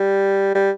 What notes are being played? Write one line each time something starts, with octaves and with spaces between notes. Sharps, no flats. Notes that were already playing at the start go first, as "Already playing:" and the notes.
Already playing: G3
G3